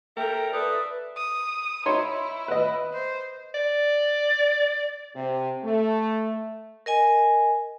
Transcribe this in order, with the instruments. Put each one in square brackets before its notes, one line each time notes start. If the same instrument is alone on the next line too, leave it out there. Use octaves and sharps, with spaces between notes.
[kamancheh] A4 E5 [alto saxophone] A#4 [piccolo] G5
[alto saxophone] A4 [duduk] B4 [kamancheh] D5 E5 [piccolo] D#6
[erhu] D#6
[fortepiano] D#4 C#5 C6 [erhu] E4
[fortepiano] B4 D#5
[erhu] C5
[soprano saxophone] D5
[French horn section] C3
A3
[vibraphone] A#4 D#5 G#5